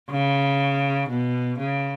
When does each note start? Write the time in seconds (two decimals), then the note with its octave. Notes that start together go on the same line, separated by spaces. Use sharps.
0.10 C#3
1.10 B2
1.59 C#3